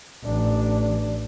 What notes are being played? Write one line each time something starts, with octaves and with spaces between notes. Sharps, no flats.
A1 D4